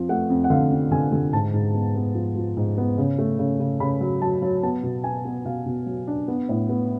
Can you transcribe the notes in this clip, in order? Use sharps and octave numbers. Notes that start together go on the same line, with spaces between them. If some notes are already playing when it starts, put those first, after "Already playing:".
Already playing: F2 F3
A3 F#5
F2
F#5
D3 F5
F2
D3 G#5
D3
G#2 A5
G#2
B3
B3
F3
F3
G#2
B3
C#3
A3
C#3
C#3
C#3 B5
F#3
F#3 A5
F#3
B3 A5
B2
B3 G#5
B3
B2 F5
B2
F#3
D4
B3
A2
B3